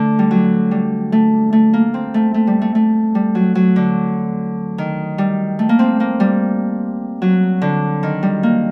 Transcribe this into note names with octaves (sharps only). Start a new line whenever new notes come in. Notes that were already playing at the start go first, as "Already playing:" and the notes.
Already playing: D3 A3
G3
F#3
G3
A3
A3
A#3
C4
A3
A3
G3
A3
A3
G3
F#3
F#3
D3
D#3
G3
A3
A#3
C4
A#3
G3
F#3
D3
D#3
G3
A#3